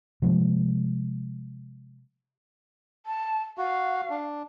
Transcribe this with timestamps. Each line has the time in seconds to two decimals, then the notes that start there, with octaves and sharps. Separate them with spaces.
0.22 C3 F3 G#3 A#3
3.06 A5
3.58 F#4 F5
4.10 D4